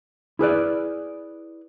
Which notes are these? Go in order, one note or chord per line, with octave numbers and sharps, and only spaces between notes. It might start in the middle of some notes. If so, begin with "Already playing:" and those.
E4 G#4 B4 D5